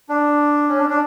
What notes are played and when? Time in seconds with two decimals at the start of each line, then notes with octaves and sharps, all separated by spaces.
0.09 D4
0.69 C#4
0.79 D4
0.90 D4